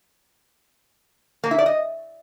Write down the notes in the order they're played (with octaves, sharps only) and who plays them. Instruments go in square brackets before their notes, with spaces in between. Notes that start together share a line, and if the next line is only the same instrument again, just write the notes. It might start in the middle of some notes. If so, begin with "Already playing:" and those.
[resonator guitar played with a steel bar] A#3
E4
D5
D#5